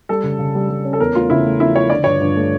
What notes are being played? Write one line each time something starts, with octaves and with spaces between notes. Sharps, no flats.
G3 A4
C#3
C#3
G3
G3
C#4
A4
E2 A#4
A3 F4
C#3 E4
A3
F3 E4
F3 C#5
D3 D5
G2 C#5
G2
A3